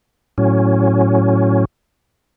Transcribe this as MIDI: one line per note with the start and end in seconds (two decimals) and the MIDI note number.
0.38 1.65 45
0.38 1.65 54
0.38 1.65 61